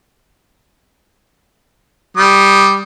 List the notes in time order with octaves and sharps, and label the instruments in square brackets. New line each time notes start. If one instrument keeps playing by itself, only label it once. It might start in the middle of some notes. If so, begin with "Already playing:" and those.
[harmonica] G3 D#6